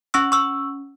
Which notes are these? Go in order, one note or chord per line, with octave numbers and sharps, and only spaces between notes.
C#4 C#6 E6
C#6 E6